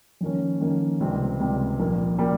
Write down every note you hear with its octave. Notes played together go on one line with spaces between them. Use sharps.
F2 D#3 A#3 C#4
F2 D#3 A#3 C#4
C#2 C3 G3 C4
C#2 C3 G3 C4
A#1 A#2 G3 A#3
A#2 G3 A#3